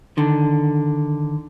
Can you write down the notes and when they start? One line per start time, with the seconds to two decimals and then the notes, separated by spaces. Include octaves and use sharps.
0.17 D3 D#3